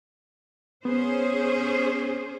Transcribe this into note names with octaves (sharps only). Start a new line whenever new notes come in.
B3 C#4 G#4 C5